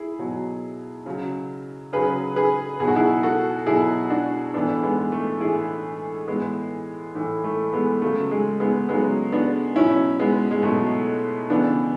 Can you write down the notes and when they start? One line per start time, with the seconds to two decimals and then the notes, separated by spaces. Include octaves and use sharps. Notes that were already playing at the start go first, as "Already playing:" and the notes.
Already playing: E4 G#4
0.19 B2 F#3
1.06 C#3 F#3
1.93 C#3 F#3 G#4 B4
2.36 G#4 B4
2.80 B2 F#3 G#4
2.88 F#4
2.96 E4 G#4
3.23 F#4 A4
3.66 B2 F#3 E4 G#4
4.10 D4 F#4
4.53 A2 E3 B3 D4
4.83 G#3 B3
5.12 A3
5.40 A2 E3 E4 G#4
6.27 A2 E3 G#3 B3
7.15 A2 E3
7.44 A3
7.73 G#3 B3
8.02 C#3 F#3 A3
8.31 G#3
8.60 G#3 B3
8.89 C#3 F#3 G#3 B3
9.32 B3 D4
9.76 B2 F#3 C#4 E4
10.19 G#3 B3
10.51 G#3
10.63 B2 F#3 A3
11.50 C#3 E3 B3 D4